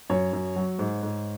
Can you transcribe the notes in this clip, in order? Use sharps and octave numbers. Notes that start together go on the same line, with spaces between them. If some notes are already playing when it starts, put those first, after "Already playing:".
F#2 C#5
F#2
F#3
G#2
G#2